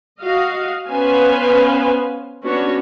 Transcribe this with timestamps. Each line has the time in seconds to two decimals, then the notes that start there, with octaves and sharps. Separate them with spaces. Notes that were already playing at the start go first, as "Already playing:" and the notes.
0.21 F#4 D#5 F5
0.88 B3 C#4 B4 C5 F5 G#5
2.44 B3 C#4 D4 F#4 C#5